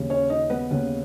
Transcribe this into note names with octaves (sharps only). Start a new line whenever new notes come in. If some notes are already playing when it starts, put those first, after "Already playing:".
Already playing: D#2 C#3
C#4 C#5
D#4 D#5
B3 B4
D#2 C#3